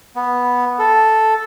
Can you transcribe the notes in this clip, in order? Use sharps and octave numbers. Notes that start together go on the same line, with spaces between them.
B3
A4